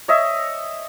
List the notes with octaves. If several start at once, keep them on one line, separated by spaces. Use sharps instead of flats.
C#5 D#5 E5